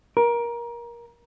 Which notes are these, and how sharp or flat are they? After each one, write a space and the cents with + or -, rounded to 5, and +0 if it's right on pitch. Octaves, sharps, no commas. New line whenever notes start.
A#4 +20